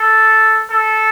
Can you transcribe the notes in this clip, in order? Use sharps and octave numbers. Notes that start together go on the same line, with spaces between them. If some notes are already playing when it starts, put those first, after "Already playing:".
Already playing: A4
A4